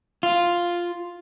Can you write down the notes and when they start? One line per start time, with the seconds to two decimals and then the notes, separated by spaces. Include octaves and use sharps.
0.23 F4